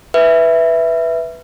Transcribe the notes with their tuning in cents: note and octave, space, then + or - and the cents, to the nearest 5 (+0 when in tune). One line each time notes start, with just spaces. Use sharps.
B4 +0 E5 +0